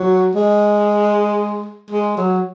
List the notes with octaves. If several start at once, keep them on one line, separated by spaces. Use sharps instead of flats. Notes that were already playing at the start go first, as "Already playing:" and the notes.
Already playing: F#3
G#3
G#3
F#3